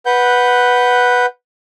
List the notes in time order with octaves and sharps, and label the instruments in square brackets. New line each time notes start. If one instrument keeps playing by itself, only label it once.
[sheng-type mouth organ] B4 F#5 G6